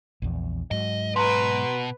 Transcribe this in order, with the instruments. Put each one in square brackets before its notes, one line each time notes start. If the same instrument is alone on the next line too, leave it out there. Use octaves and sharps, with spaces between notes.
[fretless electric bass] A#1 E2
[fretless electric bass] G#2 F#3 [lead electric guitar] D#5
[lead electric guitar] B2 [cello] B4 [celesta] A#5 C6